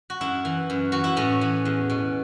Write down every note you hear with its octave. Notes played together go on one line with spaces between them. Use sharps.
F#4
F#2 E4
E3
F#2
E3 F#4
E4
A2 C#4
E3
E2
B2